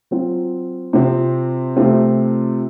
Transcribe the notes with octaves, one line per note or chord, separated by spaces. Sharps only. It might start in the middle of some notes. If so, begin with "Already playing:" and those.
F#3 C4 F4
C3 F3 C4
C3 F3 A3 C4 F4